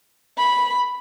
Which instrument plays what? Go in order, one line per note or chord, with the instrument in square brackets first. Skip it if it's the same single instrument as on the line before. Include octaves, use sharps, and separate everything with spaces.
[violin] B5